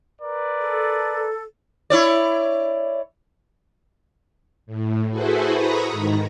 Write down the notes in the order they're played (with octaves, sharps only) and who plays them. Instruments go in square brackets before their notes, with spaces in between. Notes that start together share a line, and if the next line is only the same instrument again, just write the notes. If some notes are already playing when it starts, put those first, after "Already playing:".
[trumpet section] A#4 B4 D5
[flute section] A4
[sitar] E4 C#5 D5
[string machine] A2
E4 F#4 G#4 A4 B4 C5
A#5 B5 C#6 D#6 A#6
G#2 D#3